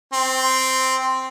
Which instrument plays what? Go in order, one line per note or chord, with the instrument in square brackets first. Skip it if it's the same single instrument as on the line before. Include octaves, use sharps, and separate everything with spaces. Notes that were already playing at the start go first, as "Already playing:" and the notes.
[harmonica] C4